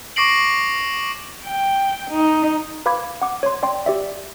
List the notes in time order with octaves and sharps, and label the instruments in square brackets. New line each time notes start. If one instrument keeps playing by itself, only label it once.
[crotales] C#6 D6 A#6 C7 D7 F#7
[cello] G5
D#4
[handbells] B4 F5 B5 D6 G#6
F#5 D6
C#5 C6
D5 G5 C6
G4 D5 E5